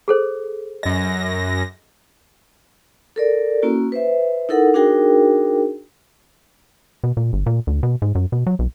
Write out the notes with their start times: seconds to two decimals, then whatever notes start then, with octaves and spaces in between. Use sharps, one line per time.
0.08 G#4 A4 C5
0.83 F#2 D#5 A#6
3.16 A4 A#4 D5
3.62 A#3 C#4 E4 F#4
3.92 B4 C5 E5
4.49 D#4 E4 A4 A#4 F#5
4.74 D4 D#4 F#4 G#4 A#4 G5
7.04 B2
7.17 A#2
7.33 G1
7.46 A#2
7.67 D2
7.83 B2
8.02 G#2
8.15 F#2
8.32 B2
8.47 F#3
8.59 B1